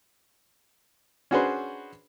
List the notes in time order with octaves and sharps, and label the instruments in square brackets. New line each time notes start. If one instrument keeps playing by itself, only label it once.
[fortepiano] C#4 D4 F#4 G#4 B4 C5